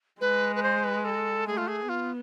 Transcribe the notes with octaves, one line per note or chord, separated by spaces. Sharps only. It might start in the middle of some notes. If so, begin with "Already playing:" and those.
G#3 B4
B4
C5
B4
A4
A3 G#4
F4
G#4
B3 F4